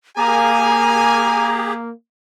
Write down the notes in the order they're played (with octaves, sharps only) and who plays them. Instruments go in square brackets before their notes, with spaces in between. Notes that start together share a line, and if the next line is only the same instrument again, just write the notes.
[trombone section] A#3 [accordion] G4 G#4 [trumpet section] G#5 [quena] A#5